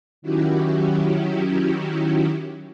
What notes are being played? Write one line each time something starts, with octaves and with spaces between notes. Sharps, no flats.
D#3 F#3 C#4 E4 F#4 G4